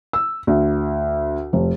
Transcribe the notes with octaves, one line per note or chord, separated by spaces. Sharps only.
E6
D2
F1